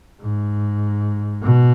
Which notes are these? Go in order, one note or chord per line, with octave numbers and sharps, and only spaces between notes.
G#2
B2